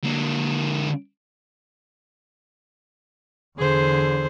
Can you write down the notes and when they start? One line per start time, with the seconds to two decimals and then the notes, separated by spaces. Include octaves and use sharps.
0.04 D3 A#3
3.59 E2 D3 G#4 C5